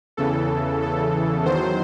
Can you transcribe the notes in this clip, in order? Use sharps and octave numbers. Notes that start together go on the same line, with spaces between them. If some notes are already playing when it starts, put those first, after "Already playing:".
E2 C#3 E3 A4
A4
E2 D#3 F#3 C5